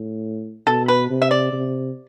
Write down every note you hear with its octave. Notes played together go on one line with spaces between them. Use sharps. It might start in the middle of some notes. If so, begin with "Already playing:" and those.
Already playing: A2
B2 A4
B4
C3
E5
D5
C3